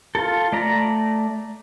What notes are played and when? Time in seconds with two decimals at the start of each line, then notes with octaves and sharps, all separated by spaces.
0.15 F4 A4
0.52 A3 D5 A#5